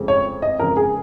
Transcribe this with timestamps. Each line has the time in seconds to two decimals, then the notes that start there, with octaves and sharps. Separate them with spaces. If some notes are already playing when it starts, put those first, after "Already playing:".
Already playing: F1 F2 C#3 G#3
0.08 C#5
0.42 D#5
0.60 F1 F2 C#3 G#3 A#4
0.77 G#4